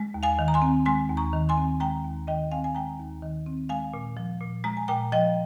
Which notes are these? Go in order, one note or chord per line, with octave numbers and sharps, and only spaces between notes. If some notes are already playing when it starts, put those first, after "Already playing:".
Already playing: G#3
D#2
F5 G#5
D#3
A#5
G#5 C6
C4
G#3 G#5 C6
D#2
A#5 C#6
D#3
G#5 C6
C4
G#3 G5 A#5
D#2
D#3 D#5 G5
C4 F5 G#5
G#5
G#3 G5 A#5
D#2
D#3
C4
G#3 F5 G#5
A#2
F3
A#2
G#3 A#5
G#5
A#2 G5 A#5
F3 D#5 G5